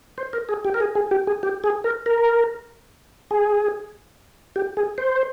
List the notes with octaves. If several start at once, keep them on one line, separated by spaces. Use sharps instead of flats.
C5
A#4
G#4
G4
A#4
G#4
G#4
G4
G#4
G4
G#4
A#4
A#4
G#4
G4
G#4
C5